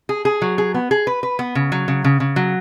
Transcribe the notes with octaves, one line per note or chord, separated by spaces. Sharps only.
G#4
G#4
F#3
G#4
B3
G#4
B4
B4
B3
C#3
F#3
C#3
C#3
C#3
F#3